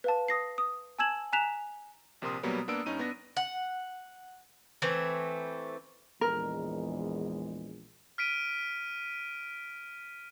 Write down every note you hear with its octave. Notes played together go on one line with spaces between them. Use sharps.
B4 F5 A5
D#6 A#6 C7
D#6
G#5 A5 E6 G#6 E7 F#7
G#5 A#5 F#6 B6 E7 F7
A#1 C3 A#4 C6 D#6
B2 F#3 G3 A#3 B3
A#3 B3 D4 E6 D7
G2 C#4 D#4 D#7
B3 D4 A#6
F#5
E3 A3 C4
A#1 E2 G#3 A#4
F6 B6 D7 D#7